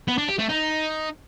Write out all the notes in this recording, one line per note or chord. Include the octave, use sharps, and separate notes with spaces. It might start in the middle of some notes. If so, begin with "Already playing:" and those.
B3
D4
G4
A3
D#4